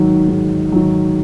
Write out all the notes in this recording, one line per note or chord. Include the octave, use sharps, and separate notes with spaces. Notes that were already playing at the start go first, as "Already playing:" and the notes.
Already playing: G#2 D#3 F#3
G#2
D#3 F#3